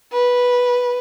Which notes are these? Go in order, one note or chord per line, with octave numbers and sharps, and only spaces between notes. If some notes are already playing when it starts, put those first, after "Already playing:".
B4